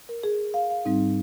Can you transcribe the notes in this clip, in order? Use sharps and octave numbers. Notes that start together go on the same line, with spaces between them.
A#4
G#4
F5
F5
G#2 G3 C4 D#4